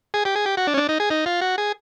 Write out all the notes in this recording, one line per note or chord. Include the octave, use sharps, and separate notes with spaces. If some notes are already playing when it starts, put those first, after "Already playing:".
G#4
G4
G#4
G4
F#4
D4
C#4
D4
D#4
G#4
D#4
F4
F#4
G#4